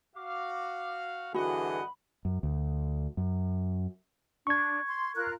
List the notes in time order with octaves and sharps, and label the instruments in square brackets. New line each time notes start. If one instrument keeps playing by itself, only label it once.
[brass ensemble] F#4 F5 [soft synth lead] D6
[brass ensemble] G2 D#5 F#5 [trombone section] D3 E3 G#4 [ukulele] F#4 [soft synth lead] B5
[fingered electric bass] F#2
D2
F#2
[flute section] D4 [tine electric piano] C#6 G#6
[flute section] C6
F4 A#4 F#6